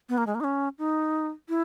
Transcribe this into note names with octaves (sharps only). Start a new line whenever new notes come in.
B3
A#3
G#3
A#3
D#4
C#4
D#4
E4